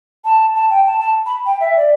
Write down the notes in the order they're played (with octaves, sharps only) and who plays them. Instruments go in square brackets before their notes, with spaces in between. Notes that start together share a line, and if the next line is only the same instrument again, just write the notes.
[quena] A5
A5
G5
A5
A5
B5
G5
E5
D5